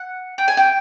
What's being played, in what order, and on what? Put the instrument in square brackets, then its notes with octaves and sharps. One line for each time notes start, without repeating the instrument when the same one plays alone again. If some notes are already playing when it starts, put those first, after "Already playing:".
Already playing: [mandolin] F#5
G5
G#5
G5